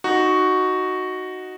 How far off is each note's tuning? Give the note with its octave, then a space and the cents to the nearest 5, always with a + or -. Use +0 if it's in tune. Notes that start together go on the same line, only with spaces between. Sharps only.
D#4 +0 F#4 +0